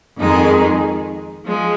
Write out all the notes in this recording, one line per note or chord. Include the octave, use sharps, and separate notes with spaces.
F2 D#3 G#3 D#4 G#4
F3 G#3